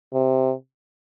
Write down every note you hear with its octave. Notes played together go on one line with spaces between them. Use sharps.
C3